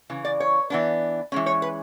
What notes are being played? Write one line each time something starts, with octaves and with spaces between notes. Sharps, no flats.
C#3 E3
D5
C#5
E3 B3 D4
E3 G#3 C#4
C#5
B4